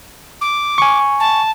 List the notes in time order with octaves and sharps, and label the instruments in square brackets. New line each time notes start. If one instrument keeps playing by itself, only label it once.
[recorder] D6
[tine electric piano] G#5 C#6
[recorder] A5